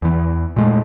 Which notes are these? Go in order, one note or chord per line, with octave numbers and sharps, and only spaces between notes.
E2 E3
A#2 G#3 A3